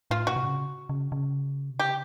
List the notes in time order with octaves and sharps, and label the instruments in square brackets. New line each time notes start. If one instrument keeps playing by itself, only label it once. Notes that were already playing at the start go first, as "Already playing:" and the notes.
[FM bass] A2 [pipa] F4
[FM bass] A#2 [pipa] F#4
[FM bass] C3
C#3
C#3
C#3
C3
[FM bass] C#3 [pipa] G4